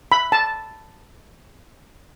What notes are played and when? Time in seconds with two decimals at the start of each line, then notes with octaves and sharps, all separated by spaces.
0.12 B5
0.32 A5